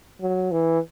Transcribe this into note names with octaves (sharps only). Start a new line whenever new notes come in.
F#3
E3